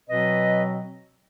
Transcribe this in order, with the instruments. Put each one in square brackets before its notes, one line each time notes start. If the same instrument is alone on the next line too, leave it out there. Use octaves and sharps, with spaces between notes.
[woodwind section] B2 F#3 C4 B4 D#5